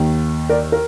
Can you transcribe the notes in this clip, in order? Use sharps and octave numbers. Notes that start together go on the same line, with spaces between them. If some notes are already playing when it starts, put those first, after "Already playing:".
Already playing: D#2 D#3
A#4 D5
A#4